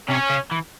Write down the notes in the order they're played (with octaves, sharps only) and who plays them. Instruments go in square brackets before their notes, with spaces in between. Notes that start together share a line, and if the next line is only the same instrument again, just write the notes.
[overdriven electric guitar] C3 [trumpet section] C#4
[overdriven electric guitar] C#3
E3